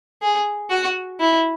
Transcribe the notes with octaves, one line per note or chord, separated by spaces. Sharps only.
G#4
F#4
E4